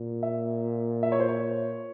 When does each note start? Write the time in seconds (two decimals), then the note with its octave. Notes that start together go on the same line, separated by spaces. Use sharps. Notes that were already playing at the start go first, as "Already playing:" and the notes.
Already playing: A#2
0.23 E5
1.03 E5
1.12 C#5
1.20 C5
1.28 C#5